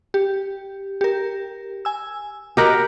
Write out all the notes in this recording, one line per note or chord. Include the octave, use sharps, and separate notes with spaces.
G4
G4 A#4
G#5 E6
F#4 G4 A#4 D#5 F#5 A#6